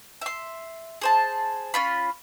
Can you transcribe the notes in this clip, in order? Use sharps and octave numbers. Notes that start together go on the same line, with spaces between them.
E5 C6
G#4 C5 A5
C#4 F4 B5